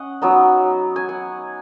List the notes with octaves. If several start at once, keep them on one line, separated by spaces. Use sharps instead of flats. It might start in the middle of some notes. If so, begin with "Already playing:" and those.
Already playing: C#4 D#5 F#5
F#3 B3 D#4
G#5
F#5